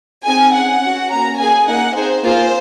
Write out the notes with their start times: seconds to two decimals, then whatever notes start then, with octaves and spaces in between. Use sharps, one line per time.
0.25 C4 D#4 G#4 G#5
0.53 C#4 G#4 F#5
0.81 C#4 F#4
1.09 A#3 C#4 F#4 A#5
1.38 A#3 C#4 G#4 G#5
1.67 A#3 D#4 G#4 F#5
1.95 C4 D#4 G#4 C5
2.23 A#3 F4 G#4 C5